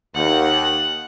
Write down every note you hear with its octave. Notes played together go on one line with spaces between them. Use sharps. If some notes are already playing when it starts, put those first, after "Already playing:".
D#2 F#5